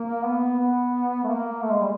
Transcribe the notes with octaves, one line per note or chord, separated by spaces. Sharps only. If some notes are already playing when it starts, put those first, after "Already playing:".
Already playing: A#3
B3
B3
A3
A#3
A3
G#3
G3